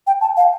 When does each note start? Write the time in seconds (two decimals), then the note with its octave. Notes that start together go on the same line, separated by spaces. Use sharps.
0.07 G5
0.21 A5
0.37 F5